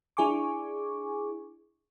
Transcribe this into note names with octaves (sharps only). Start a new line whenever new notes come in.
D4 E4 G#4 G#5 C#6 D6